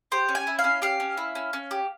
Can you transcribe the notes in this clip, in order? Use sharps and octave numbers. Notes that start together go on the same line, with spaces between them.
G4 C5
C#4
G#5
E4
F5
C#4
G4 F5
C#4
E4
C#4
C#4
G4